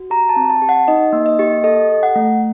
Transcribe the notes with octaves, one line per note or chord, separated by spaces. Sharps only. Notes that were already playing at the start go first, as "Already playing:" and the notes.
Already playing: F#4
G4 A#5
A5
C4
A5
G4
F#5
D#4 D#5
A#3
D#5
G4
A4 D#5
A4
F#5
A3